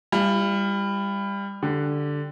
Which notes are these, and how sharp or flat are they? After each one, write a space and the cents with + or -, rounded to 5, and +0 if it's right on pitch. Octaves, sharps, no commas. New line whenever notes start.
G3 +25 F4 -45
D3 +0 G4 -10